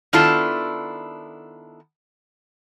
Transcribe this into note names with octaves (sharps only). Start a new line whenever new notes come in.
D#3 B3 D4 E4 F4 A4